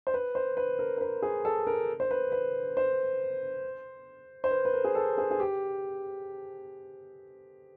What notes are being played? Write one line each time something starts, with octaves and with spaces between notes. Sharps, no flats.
C5
B4
C5
B4
A#4
A#4
B4
G#4
A4
A#4
C5
B4
B4
C5
C5
B4
B4
A#4
G#4
A4
G#4
G#4
G4